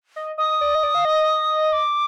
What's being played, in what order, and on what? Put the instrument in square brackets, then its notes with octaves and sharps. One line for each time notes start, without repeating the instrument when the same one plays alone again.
[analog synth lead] D#5
[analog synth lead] D#5 [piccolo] D#6
[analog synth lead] D5
D#5
D5
F5
D#5
[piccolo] D6